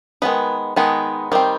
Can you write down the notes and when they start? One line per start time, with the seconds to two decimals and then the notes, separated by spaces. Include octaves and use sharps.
0.22 D#3 G#3 B3 D#4 B4
0.76 D#3 G#3 B3 D#4
1.32 D#3 G3 C4